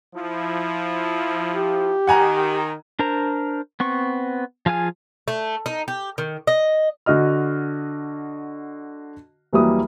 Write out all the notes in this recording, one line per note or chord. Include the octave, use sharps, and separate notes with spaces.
F3 E4
G4
D#3 F#5 G#5 A#5
D4 A#4 C5 A#5
B3 C4 C#6
F3 F4 G#4 G#5 F6
A3
D#4
G4
D#3
D#5
D3 F#4 D#5 F6
D#2 E3 F#3 G3 A#3 D#6